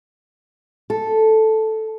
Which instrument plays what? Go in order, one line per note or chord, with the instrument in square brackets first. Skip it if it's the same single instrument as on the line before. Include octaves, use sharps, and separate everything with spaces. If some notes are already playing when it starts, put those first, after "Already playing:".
[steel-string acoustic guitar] A4